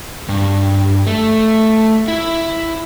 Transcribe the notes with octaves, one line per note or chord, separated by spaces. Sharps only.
G2
A3
E4